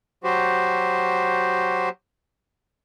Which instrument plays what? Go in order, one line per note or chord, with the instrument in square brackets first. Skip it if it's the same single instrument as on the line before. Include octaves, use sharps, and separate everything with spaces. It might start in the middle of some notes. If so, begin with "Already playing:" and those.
[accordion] F#3 F#4 G4 C5